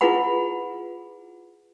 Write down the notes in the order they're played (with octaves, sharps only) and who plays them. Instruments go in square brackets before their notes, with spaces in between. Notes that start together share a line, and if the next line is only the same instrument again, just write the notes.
[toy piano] E4 F4 G#4 B4 F#5 B5